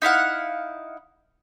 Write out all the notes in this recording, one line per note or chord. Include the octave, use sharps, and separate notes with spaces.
D#4 E4 F5 F#5